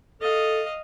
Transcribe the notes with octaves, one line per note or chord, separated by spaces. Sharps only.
A4 D#5 F5